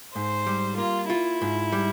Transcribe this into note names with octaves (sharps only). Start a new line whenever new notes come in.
G#2 C5
G3
A#3 F4
E4 F4
G#2
G3